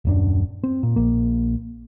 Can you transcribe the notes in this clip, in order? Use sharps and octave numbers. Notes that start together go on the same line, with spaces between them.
D#1 F#2 D4
C4
A#2
A#1 A#3